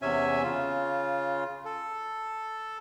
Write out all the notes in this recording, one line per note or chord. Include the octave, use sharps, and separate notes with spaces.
E2 C3 C#4 E5 G#5
C#3 F4
A4